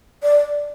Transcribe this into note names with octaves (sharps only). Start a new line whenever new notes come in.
D5